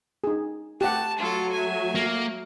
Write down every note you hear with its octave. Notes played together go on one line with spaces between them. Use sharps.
D#4 G#4
A3 G4 F#5 A5
F#3 A3 F4 A4
E5 G#5
A#3